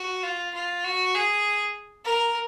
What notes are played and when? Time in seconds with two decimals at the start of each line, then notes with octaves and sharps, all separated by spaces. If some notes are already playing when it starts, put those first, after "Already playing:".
Already playing: F#4
0.23 F4
0.54 F4
0.84 F#4
1.14 G#4
2.04 A#4